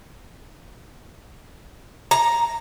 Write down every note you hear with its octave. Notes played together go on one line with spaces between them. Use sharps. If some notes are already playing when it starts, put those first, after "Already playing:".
A#5